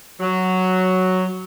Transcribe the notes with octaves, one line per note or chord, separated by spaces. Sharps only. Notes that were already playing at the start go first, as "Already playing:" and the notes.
F#3